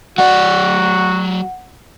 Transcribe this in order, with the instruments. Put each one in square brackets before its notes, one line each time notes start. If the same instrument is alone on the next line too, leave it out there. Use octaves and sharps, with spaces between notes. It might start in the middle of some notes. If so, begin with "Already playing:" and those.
[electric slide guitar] F#3 D5 [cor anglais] F#4 [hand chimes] F#5